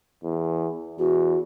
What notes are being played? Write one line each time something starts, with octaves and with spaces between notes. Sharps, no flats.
E2
E2 F#4